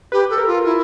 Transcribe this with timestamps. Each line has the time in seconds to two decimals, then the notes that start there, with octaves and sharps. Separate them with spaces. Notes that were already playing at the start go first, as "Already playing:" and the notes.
0.12 G4 B4
0.30 A4
0.38 A#4
0.47 F4
0.65 E4